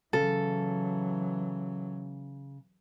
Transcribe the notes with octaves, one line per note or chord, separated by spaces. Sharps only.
C#3 E3 F#3 A4